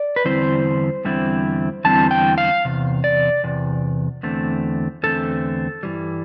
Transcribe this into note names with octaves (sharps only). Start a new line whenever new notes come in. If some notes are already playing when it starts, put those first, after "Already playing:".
Already playing: D5
B4
E2 D3 G3 C4 E4 C5
E2 D3 G3 C4 E4
E2 D3 G3 C4 E4 A5
G5
F5
E2 C3
D5
E2 C3
E2 D3 A3 C4
E2 D3 A3 C4 A4
G2 E3 G3